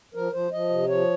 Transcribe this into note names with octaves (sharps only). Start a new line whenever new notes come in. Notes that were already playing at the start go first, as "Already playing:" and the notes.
F3 A#4
F3 C5
F3 D#5
C3
F3 C#5